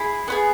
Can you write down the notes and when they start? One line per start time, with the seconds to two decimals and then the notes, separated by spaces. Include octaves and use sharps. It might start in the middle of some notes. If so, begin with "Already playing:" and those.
Already playing: E4 G#4
0.28 B3 E4 G#4